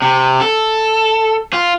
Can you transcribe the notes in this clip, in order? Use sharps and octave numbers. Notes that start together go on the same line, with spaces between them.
C3
A4
F4